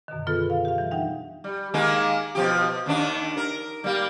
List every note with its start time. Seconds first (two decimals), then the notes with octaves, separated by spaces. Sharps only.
0.08 F#2 B2 D3 D#3
0.27 B3 F4 G#4 A4 B4
0.50 F5
0.65 G4 F5
0.78 E3 G3
0.91 D4 D#4 E5 F#5 G5
1.44 G3
1.74 D#3 G#3 A#3
2.35 B2 F3 G4
2.86 D#2 D#3 D4
3.37 A#4
3.84 G3 A#3